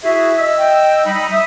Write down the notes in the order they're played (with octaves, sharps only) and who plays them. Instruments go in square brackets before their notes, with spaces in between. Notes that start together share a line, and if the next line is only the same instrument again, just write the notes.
[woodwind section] E4 F#4 G#4 [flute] E5
[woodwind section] D#5 E6
[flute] G5
[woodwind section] G3 D#4 [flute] B5
[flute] E5 [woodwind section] D#6